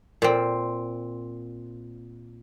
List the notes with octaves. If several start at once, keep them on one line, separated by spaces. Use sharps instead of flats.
A#2 C4